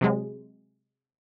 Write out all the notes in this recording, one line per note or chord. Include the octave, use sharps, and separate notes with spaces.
C3 F#3 G#3